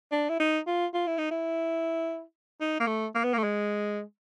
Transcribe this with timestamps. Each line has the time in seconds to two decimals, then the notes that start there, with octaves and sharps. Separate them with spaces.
0.12 D4
0.29 E4
0.40 D#4
0.67 F4
0.94 F4
1.07 E4
1.18 D#4
1.31 E4
2.61 D#4
2.80 A#3
2.87 A3
3.15 A#3
3.24 B3
3.34 A#3
3.38 A3
3.43 G#3